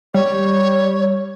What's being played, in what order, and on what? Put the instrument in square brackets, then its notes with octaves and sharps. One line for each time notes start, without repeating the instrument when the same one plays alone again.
[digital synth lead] G3 [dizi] C#5